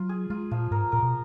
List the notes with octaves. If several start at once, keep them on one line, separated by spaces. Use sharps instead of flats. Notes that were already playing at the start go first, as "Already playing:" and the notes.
Already playing: F#3 F4
G#4
G#3 F4
A#2 F3
G#2 A#4
A#2 A#4
B2